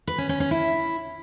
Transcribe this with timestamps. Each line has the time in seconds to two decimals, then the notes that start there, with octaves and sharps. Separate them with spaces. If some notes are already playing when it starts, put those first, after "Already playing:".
0.07 B4
0.18 C#4
0.29 C#4
0.40 C#4
0.51 E4